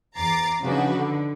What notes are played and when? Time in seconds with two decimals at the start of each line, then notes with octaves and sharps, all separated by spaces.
0.17 E2 A#5 D6 A6 C7
0.62 C#3 F3 D4 D#4 F#4 B4
0.95 D3